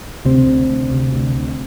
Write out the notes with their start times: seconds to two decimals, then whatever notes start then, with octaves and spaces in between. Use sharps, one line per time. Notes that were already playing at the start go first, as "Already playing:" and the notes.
0.25 D2 C3 C4
0.47 C3
0.69 D2
0.91 C3
1.13 D2
1.36 D2